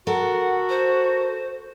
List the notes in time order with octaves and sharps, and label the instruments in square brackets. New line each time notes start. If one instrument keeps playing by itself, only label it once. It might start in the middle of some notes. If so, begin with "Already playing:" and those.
[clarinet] F#4 [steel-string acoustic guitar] A4 A#4 [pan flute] F#5
[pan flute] C5